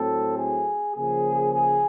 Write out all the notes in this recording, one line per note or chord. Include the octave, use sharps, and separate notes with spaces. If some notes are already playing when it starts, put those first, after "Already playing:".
Already playing: A2 F#3 A3 C4 A4
G#4
C#3 F3 A#3 G#4
G#4